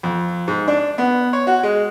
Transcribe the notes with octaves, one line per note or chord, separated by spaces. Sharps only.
F2
G#2
D4
B3
C#5
F#4
G#3